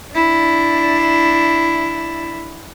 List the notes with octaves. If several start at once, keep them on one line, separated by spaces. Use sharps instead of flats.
D4 E4